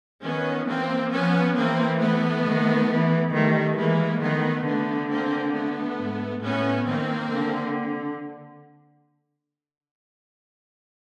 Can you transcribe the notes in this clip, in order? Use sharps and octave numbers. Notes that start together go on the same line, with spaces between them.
D#3 B3 C#4
E3 A#3 C4
F3 B3 C#4
E3 A#3 C4
A3 B3
D#3
E3
D#3 G3 A3
E3 G#3 A#3
D#3 A3 B3
D3 A3 B3
A#3 C4
A3 B3
G#2
A2 B3 C#4
D#3 A#3 C4
D3